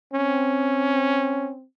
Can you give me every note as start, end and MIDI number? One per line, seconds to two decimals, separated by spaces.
0.14 1.65 60
0.14 1.52 61